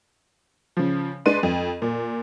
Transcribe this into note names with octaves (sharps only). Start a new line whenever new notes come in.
C#3 F3
G#3 D4 B4 C6 D#7
F2
A#2